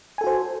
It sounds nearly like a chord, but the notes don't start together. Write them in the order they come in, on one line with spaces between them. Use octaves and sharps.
G#5 A4 F#4 C5